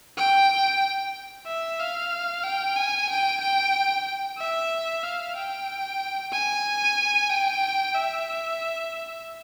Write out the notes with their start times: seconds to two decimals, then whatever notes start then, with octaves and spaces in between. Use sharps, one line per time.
0.17 G5
1.46 E5
1.80 F5
2.43 G5
2.76 G#5
3.09 G5
3.41 G5
4.38 E5
5.03 F5
5.36 G5
6.32 G#5
7.30 G5
7.95 E5